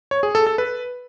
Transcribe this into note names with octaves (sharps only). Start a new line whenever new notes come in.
C#5
G#4
A4
A4
B4